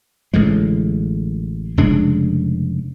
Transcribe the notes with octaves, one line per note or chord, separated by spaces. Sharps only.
A1 D3 G#3
F1 C#3 G#3 D4